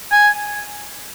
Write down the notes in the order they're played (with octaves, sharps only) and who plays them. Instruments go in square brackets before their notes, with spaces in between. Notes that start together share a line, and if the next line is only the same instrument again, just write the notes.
[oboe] G#5